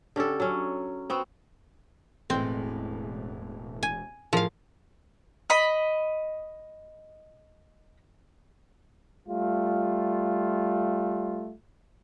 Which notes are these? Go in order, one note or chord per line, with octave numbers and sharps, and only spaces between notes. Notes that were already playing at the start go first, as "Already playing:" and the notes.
D3 C#4 G4 A4
F#3 C#4
B3 C4 F#4
E1 A2 E3 G#3 C4
G#5
A2 F3 G#4 A#4 F5
D#5 B5
G3 A3 F4